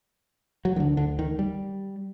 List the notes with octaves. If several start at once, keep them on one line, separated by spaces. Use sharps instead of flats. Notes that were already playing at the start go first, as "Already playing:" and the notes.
F#3
D2 D3 D#3
D3
D#3
G3